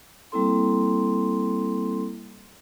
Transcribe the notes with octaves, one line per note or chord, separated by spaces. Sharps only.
G3 A#3 C4 E4 A4 C6